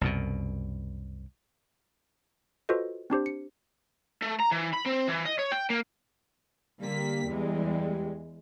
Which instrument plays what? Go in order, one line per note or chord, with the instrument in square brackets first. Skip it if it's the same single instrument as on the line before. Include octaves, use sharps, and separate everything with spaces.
[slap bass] C2 F#2 B2
[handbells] F4 F#4 A4 B4 C5 D#5
C4 D4 G4 C5
C#7
[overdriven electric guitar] A3
A#5
E3
B5
C4
E3
D#5
C#5
G5
A#3
[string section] D3 A#3 B6 [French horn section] G3
[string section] E2 G#3